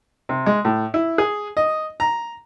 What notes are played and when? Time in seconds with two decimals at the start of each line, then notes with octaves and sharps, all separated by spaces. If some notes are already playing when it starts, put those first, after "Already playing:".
0.29 C3
0.46 G#3
0.65 A2
0.94 E4
1.18 G#4
1.57 D#5
2.00 A#5